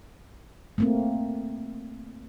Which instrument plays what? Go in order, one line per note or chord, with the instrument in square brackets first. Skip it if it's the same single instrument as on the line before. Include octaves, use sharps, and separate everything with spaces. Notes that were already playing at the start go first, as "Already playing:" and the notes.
[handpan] A3 A#3 C4